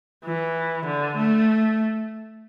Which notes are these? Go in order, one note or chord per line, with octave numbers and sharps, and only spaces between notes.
E3
D3
A3